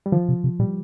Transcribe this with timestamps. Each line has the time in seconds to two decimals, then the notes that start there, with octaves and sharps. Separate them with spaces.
0.06 G3
0.12 D#3 F3
0.29 C3
0.44 C3
0.59 A#2 G3